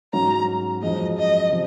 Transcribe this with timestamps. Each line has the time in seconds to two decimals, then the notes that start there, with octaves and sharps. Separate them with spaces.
0.13 G#2 F#3 C#4 A#5
0.82 F#2 F3 G#3 D#5
1.18 D#5
1.51 C3 F3